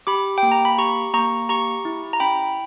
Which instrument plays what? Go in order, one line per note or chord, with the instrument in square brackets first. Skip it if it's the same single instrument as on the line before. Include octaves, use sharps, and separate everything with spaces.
[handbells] G4 B5 D6
G5
A#3
A#5
B5
G4 A#5 C#6
A#3 A#5 C#6
G4 A#5 C#6
E4
A#5
C#4 G5 B5